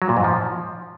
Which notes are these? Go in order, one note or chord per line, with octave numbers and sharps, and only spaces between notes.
F#3
A#2
G#2
F3